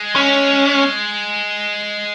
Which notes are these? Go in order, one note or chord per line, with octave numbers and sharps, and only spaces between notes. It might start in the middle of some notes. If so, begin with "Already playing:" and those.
Already playing: G#3
C#4